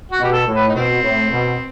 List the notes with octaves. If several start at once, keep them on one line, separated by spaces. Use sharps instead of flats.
F#4
B2 G4
A4
A2
B4
D#4
B2 C4
A2
B2